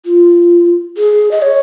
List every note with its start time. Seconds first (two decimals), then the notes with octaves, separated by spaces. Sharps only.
0.06 F4
0.97 G#4
1.31 D#5
1.42 C#5